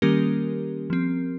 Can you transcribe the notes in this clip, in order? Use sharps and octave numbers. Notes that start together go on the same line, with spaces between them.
D#3 G3 A#3 C#4 G4 A#4
F3 C4